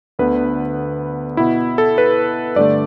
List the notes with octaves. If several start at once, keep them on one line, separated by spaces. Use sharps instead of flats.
D2 D3 B3 B4
B2 B3 E4
A4
B4
G2 D3 A3 D5